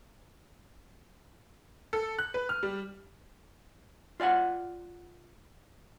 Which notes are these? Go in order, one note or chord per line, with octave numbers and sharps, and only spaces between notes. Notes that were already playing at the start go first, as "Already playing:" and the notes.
A4
F#6
B4
F6
G3
F4 D5 F5 F#5